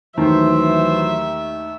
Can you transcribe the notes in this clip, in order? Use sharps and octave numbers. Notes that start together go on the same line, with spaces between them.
D#2 D#3 E3 F#3 A3 C5 E5